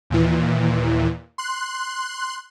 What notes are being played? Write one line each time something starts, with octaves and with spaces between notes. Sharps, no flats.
D#2 A#2 E3
C6 F#6